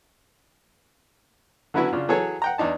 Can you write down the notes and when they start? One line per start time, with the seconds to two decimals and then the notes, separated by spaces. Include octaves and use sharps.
1.74 D3 F#3 B3 C#4 E4 F#4
1.93 C#3 D4 F4
2.08 E3 F#3 G#4 A4 C#5
2.42 F#5 G5 A#5
2.58 E2 D4 D#4 A5